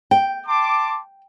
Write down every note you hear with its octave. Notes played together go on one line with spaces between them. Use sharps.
G5
A5 C6 D6